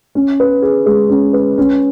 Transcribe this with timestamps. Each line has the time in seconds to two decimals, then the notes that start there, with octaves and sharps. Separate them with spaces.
0.15 C#4
0.40 B4
0.62 G#4
0.86 G#3
1.10 C#4
1.33 B4
1.58 C#4